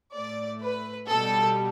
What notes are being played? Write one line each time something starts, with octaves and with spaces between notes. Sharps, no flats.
A2 A3 D5
B4
B2 G3 A4